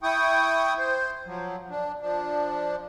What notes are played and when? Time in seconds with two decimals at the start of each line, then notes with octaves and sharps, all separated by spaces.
0.03 E4 G5 C#6 D#6
0.78 C5
1.26 F3 F#3
1.70 D4
2.01 F3 D4